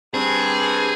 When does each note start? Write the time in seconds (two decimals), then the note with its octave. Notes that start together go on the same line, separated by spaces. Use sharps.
0.14 G2 C4 G#4